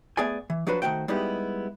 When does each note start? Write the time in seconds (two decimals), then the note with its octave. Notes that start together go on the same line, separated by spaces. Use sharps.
0.17 A3 B3 G#4 D5 G#5
0.50 E3
0.67 F3 F#3 D4 F#4 B4 C5
0.82 D#3 A3 F#4 C5 G5
1.08 G3 G#3 B3 D#4 E4 G4